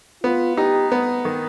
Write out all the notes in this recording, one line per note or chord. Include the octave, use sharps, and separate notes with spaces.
B3 F4
D#4 G4
B3
D#3